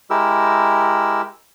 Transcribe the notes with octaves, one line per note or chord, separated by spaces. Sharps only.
G#3 E4 G4 A#4 E6